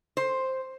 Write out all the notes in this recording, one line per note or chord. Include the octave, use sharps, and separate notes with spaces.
C5